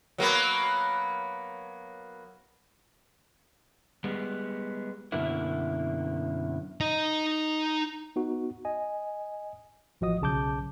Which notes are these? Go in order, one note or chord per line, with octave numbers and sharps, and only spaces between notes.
F#3 A#3 B3
G3 G#3 B3
F#2 B2 D3 A#3 E4
D#4 D#5
B3 D#4 F#4
D#5 G#5
A1 F3 F#4 D#5 D#6
B1 C#3 A5 D6 G6